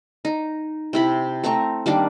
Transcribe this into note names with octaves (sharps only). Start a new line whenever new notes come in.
D#4
C3 E4 B5
A3 C4 A#5 C#6
D#3 G3 A#3 D4